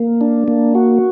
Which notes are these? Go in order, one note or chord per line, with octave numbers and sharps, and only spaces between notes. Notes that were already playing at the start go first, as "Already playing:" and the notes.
Already playing: A#3
D4
A#3
F#4